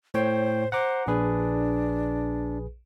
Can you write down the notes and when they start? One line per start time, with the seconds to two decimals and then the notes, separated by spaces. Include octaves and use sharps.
0.14 A2 C5 C#5 G5
0.72 C5 F#5 A#5 D6
1.07 A#1 D4 G#4 B4